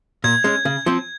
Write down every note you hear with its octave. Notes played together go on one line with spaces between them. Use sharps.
A#2 G#6
G#3 C#4
C#3
F3 C4